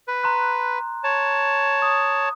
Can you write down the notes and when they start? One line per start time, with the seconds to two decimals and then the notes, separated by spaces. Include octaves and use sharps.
0.08 B4
0.23 A#5 C6 F#6
1.04 C#5 A5
1.82 D#6